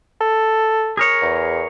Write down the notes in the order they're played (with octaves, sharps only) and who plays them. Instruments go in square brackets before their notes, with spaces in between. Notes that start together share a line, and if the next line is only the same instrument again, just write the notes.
[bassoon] A4
[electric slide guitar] G#4 A#4 C#5
[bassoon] E2